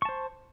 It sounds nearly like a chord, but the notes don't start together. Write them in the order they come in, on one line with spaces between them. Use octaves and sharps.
C#6 A5 C5